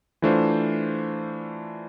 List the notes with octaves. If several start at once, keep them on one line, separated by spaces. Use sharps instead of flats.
E3 A3 D4 F4 C5